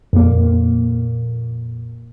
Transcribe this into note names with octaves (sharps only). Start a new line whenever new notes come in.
F2 A#2 A#3